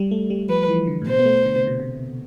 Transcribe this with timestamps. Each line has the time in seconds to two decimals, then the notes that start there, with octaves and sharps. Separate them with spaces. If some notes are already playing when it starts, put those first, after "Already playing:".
Already playing: G3
0.11 A3
0.30 G3
0.49 F3 B4
0.68 E3
0.87 D3
1.02 A2
1.07 B2 C5
1.19 B3
1.25 A3
1.46 D3
1.56 C3
1.67 B2
1.80 C3